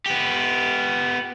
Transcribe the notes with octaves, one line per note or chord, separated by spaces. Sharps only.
B3 G4